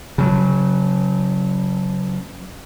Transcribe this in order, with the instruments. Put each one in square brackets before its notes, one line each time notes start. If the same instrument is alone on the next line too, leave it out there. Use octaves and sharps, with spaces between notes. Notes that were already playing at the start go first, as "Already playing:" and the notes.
[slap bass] C#3 F#3